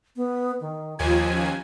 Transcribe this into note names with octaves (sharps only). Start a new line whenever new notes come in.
B3
D#3
D#2 F3 F4 G#5
C#4